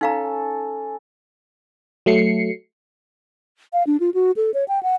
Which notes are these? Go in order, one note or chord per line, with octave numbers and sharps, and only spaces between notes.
C#4 D#4 A4 F5 A#5
F#3 A3 C7 C#7
F5
D4
F4
F#4
A4
C#5
G5
F#5